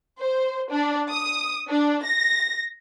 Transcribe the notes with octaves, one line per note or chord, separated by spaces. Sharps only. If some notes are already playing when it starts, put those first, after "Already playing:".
C5
D4
D#6
D4
A#6